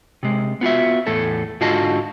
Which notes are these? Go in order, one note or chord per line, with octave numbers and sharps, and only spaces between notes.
C3 G#3
B3 F4 F#4 E5
E2 A2 A4
G#2 D3 F4 F#4 D#5 A5